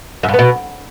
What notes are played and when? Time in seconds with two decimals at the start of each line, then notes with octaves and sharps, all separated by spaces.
0.23 F#2
0.28 G2
0.34 B3
0.39 B2